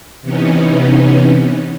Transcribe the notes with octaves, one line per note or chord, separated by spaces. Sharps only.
C3 E3 B3 C#4 D#4